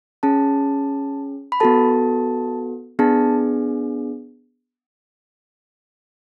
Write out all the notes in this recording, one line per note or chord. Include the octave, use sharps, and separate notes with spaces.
C#4 G#4 A5
B5
B3 F#4 A4 A5
B3 D4 G#4 A5